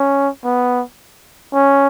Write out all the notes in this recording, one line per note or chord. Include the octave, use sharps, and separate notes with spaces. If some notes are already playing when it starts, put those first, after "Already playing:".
Already playing: C#4
B3
C#4